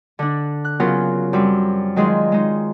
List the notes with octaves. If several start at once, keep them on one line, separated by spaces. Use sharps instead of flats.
D3 D4
F#6
C#3 F#3 B3 C#4 F4 A#4
F#2 G3 C4
D#3 F#3 G#3 F4 G#4
G#3 D#4